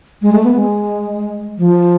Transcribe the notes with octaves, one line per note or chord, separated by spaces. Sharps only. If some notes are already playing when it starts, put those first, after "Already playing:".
G#3
A3
B3
G#3
F3